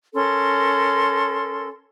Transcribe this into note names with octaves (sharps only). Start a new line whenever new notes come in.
C#4 A4 A#4 C6